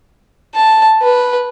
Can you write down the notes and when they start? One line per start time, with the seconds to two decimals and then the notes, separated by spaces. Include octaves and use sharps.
0.55 A5
1.02 B4